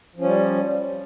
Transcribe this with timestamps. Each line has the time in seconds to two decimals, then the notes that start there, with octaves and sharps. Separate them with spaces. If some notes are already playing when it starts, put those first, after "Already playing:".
0.16 F3
0.20 C#4
0.24 G3